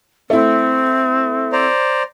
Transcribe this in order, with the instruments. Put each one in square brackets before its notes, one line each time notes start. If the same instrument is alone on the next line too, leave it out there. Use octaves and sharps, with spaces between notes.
[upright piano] A3 E4 [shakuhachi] C4
[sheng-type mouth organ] C5 D5 A#5